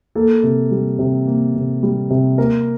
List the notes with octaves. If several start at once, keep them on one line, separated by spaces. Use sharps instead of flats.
A#3 A4
C3
G3
C3
A#3
C3
G3
C3
A#3 A#4